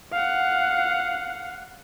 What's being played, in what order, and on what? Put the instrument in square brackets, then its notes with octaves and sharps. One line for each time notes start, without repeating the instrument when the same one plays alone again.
[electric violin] F5 F#5